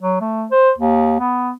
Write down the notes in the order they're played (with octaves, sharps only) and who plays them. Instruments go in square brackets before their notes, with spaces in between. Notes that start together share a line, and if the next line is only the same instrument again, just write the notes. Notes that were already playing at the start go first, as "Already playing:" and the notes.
[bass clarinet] F#3
A3
C5
D#2
B3